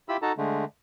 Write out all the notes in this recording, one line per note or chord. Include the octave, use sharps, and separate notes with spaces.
E4 F4 G4 B5 E6
D#4 F#4 A4 A5 A#5
D3 G#3 A3